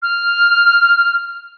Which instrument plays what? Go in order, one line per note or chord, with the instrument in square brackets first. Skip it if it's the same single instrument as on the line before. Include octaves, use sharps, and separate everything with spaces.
[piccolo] F6